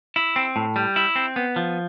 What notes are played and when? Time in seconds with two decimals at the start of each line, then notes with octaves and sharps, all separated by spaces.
0.16 E4
0.36 C4
0.56 A2
0.76 G3
0.96 E4
1.16 C4
1.36 B3
1.56 F3